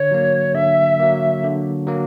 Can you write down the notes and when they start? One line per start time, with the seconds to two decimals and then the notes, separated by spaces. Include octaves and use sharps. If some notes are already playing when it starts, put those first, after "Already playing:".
Already playing: D3 C#5
0.11 F#3 A#3
0.55 D3 E5
1.00 F#3 A#3
1.44 D3
1.87 F#3 A#3